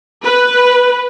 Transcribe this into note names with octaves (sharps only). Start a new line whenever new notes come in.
B4